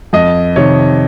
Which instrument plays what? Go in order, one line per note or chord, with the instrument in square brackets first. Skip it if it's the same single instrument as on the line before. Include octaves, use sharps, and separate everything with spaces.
[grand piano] F2 D#5
C3 D#3 C#5